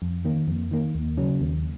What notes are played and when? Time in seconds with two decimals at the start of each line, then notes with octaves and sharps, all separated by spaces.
0.02 F2
0.25 D#3 A#3
0.47 F2
0.71 D#3 A#3
0.95 D#2
1.17 C#3 F#3 C#4
1.41 D#2